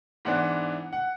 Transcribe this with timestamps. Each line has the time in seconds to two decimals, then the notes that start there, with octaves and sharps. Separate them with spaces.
0.25 G#2 E3 B3 D4 F#5
0.93 F#5